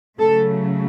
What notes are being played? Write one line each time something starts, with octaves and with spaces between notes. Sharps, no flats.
C#3 F#3 A3 A4